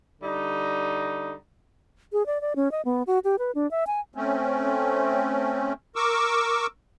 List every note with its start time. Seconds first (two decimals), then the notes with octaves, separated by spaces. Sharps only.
0.20 D3 G3 D#4
2.13 G#4
2.26 D5
2.41 D5
2.56 C#4
2.72 D#5
2.85 B3
3.07 F#4
3.24 G4
3.39 B4
3.55 D4
3.71 E5
3.87 G#5
4.14 A3 C4 C#4
5.96 A#4 C#6 D6 E6